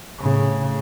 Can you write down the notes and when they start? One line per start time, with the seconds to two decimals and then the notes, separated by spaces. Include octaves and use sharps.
0.20 A2 C#3